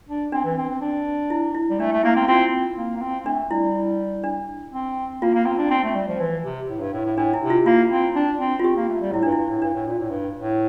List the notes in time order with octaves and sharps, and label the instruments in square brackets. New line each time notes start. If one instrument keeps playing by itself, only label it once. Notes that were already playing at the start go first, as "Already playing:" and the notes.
[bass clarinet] D4
[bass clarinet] C4 [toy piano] D4
[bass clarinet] E3
C4
C4
D4
[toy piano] E4
E4
[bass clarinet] G3
[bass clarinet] A3 [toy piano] D4
[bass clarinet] A3
[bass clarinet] A#3 [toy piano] E4
[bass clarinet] C4
[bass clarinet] C4 [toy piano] F4
[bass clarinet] A#3
A#3
C4
[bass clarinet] A3 [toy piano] D4
[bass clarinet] G3 [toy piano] E4
[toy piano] D4
[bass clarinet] C4
[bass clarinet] A#3 [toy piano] F4
[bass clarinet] A#3
C4
D4
C4
A3
G3
F3
E3
C3
A2
G2
A2
A2
[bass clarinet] A2 [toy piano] D4
[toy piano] E4
[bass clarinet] C3
[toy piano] F4
[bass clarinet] A#3 [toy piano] F4
[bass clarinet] C4
D4
C4
[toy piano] F4
[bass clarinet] C4 [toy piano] G4
[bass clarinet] A#3
A3
G3
[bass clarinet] A2 [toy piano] E4
[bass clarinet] G2 [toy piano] D4
[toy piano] E4
[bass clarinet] G2
A2
[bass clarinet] G2 [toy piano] D4
[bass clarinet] A2
A#2
A2
G2
A2